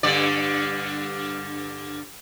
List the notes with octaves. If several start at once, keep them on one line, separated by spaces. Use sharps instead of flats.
G2 D3 D5